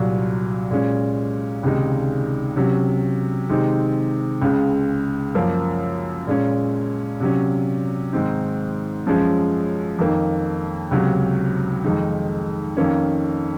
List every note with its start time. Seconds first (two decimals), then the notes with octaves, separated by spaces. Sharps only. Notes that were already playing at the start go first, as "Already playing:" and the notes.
Already playing: C2 A#2 F#3
0.70 A#2 G#3 C#4
1.63 C#2 C3 D#3 G#3 D#4
2.56 C3 F#3 C#4
3.49 C3 D#3 G#3 C4 D#4
4.42 C#2 C#3 G#3
5.35 F#2 F3 A#3
6.27 A#2 G#3 C#4
7.20 C3 F#3 C#4
8.13 G#2 D#3 G#3 C4 D#4
9.06 F#2 F3 G#3 C#4
9.99 F2 D#3 A#3 D#4
10.91 C#2 C3 F#3 C#4
11.84 F2 D#3 G#3 D#4
12.77 F2 D#3 A#3 C#4